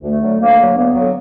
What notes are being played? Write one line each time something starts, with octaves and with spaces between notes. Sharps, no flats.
D2 A3
D3 F#3
D2 A#3
D3 F#3
D2 B3
F#3
D3